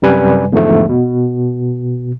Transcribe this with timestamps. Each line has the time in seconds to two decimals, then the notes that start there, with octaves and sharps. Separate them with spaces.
0.02 F#2 C3 G3 B4 G#5
0.53 E2 G#2 D3 F3 A3
0.89 B2